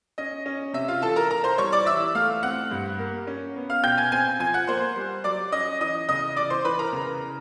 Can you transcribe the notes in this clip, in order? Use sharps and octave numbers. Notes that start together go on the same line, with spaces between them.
C#4 D#5
C#4
C3 E5
F4 F5
E3 A4 A5
A#4 A#5
E3 A#4 A#5
C5 C6
G3 C#5 C#6
D5 D6
E3 E5 E6
A3 F5 F6
C4 F#5 F#6
G2
A#3
C#4
B3
F5 F6
B2 G5 G6
G#5 G#6
C4 G#5 G#6
F3 G#5 G#6
F#5 F#6
A#3 C5 C6
G3
F#3 D5 D6
C#4 D#5 D#6
E3 D#5 D#6
C#3 D#5 D#6
E3 D5 D6
C5 C6
E3 B4 B5
A#4 A#5
C#3